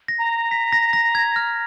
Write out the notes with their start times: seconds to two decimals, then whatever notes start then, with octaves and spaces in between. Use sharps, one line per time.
0.08 A#6
0.19 A#5
0.51 B6
0.72 A#6
0.93 A#6
1.15 G#6
1.36 F6